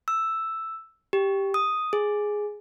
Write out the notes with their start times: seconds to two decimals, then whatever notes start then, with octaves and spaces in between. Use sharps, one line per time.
0.08 E6
1.13 G4
1.54 D#6
1.93 G#4